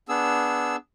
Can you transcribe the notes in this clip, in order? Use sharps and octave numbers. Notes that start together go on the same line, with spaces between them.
B3 D4 G#4 E6